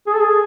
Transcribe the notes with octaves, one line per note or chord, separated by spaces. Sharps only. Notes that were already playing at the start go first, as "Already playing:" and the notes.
G#4
A4
G#4